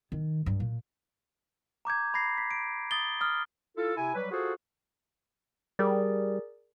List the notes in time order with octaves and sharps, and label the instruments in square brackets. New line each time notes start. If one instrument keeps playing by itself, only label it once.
[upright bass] D#3
G2
A#2
[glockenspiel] A#5 D6 G6 G#6
B5 G#6 A#6 C7
B6
D7
D#6 A6 G7
D#6 F6
[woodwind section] E4 F4 A4
C3 E4 G#5
F#3 G3 B4
F4 F#4 G#4 A4 C5
[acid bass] G3 [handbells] G#4 A#4 D5